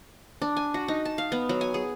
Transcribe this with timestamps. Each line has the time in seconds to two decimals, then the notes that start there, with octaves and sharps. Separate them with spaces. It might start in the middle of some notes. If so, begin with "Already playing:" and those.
0.42 D4
0.57 G#5
0.74 F#4
0.88 D#4
1.05 A5
1.18 F5
1.32 B3
1.49 F#3
1.61 G#5
1.74 G#4